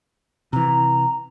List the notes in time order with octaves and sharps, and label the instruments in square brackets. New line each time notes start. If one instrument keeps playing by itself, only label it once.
[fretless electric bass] C3 E3 [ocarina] A#5